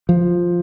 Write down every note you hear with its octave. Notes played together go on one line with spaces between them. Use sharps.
F3